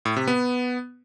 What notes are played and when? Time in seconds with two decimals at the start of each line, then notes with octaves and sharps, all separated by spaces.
0.05 A2
0.16 C3
0.27 B3